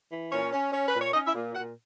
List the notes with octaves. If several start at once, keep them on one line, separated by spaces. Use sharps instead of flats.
E3
A#2 C#4 C#5
C#4
C#4
B4
A#2
C#5
C#4 D#4 D#5
E4 E5
A#2
A#2 F#4 F#5